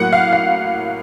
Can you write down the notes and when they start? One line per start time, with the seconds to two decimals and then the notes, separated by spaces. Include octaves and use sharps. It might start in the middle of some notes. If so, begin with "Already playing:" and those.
Already playing: A2 F#3 A#3 F#5
0.13 F5
0.33 F5